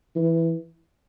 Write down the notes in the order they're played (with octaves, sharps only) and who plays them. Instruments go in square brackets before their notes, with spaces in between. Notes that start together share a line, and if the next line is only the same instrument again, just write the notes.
[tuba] E3